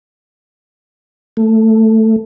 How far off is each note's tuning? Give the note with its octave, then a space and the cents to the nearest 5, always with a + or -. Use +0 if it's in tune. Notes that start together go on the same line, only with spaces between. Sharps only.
A3 +10